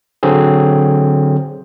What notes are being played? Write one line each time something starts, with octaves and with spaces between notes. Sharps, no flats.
D3 F#3 C4 G#4